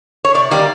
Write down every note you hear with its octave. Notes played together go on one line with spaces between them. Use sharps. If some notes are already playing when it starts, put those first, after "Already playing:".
C#5
C3 D5
D#3 G3 A#3 D5